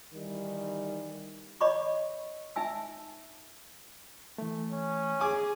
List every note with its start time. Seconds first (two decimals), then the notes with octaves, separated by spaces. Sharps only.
0.13 D#3 E3 G3
1.61 C#5 D#5 B5 C#6 D6
2.56 D#4 E5 G#5 E6
4.38 E3 A3
4.71 C#4
5.21 G#4 G#5 D6